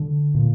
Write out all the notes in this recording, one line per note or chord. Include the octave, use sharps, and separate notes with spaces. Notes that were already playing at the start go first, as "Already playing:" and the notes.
Already playing: D3
A#2